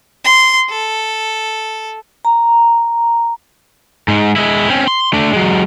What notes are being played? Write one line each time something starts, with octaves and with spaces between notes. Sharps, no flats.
C6
A4
A#5
G#2 G#3
G#3 E4
C4 C#4
C6
A3 D4
F#3 G#3